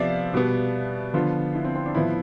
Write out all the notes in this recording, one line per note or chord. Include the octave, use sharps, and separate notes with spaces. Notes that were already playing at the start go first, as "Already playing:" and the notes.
Already playing: C3 F3 B3 D5 E5 F5
B2 G3 B3
D3 F3 B3 F4
E4
C4
C4
D4
A2 F3 B3 E4